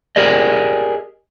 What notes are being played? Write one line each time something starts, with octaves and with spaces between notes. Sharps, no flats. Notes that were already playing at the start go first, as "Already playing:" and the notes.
G4 G#4 A#4 D5 D#5